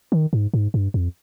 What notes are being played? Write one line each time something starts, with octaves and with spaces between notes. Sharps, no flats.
D#3
G#2
G#2
G2
F2